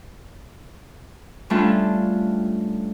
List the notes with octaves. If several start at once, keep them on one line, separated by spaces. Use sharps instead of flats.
G3 A3 C#4 D4 F4 A4